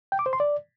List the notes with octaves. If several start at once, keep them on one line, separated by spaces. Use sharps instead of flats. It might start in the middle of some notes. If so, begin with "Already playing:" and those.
G5
D6
C5
C6
D5